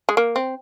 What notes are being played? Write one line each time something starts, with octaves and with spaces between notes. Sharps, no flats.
G#3
A#3
C4